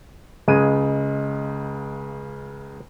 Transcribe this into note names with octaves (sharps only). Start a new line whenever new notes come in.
C#2 C#3 G#3 D#7